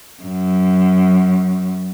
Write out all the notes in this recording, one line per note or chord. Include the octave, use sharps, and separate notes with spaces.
F#2